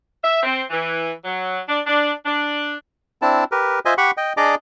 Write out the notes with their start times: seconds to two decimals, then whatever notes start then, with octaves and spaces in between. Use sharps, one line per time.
0.23 E5
0.43 C4
0.70 E3
1.24 F#3
1.67 D4
1.86 D4
2.25 D4
3.22 C4 D4 E4 A5
3.52 G4 A#4 B4
3.85 F4 C5 D#5 E5 G#5
3.98 G4 F#5 B5 C#6
4.17 D#5 G5
4.37 D4 G#4 D5 D#5 A#5 D6